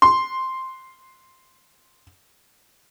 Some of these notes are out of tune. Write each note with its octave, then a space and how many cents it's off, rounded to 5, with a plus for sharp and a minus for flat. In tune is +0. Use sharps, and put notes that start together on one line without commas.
C6 +0